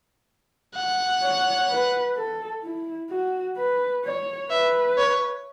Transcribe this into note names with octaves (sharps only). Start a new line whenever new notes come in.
F#5
C#5
B4
A4
E4
F#4
B4
C#5
B4 E5
C#5